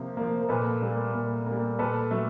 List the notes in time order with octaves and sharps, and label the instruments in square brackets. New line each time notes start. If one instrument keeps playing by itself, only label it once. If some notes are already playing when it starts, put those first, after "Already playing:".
Already playing: [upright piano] C3 F3 A#3
F3 A#3
A#4
A#2 A4 B4
G3 A#3
A#2
G3 A#3
A#2 A4 B4
F#3 A3